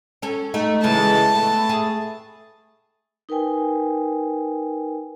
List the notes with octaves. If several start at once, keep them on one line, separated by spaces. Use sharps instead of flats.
C#4 A4
A3 D#4 A4
C#3 E3 G#3 A4 A5
A3 B3
G#4
D#4 A#4 B4 G5 G#5